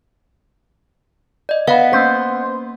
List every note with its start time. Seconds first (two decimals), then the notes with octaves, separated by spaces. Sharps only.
1.49 D5 D#5
1.67 B3 F5 F#5 B5
1.93 A#3 C#4 C5 B6